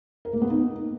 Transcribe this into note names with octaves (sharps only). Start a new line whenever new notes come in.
A#4
A#3
B3
D#4